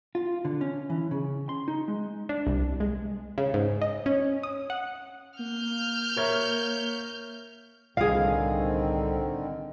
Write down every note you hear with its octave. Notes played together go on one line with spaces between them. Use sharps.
F4
D3
C#4
E3
C#3
C6
D#4
G#3
D4
C2
G#3
C#3
G#2
D#5
C#4
D#6
F#5
A#3 F6 G6
A#4 C#5 E5
C2 A2 D3 D#3 C4 G#4 F5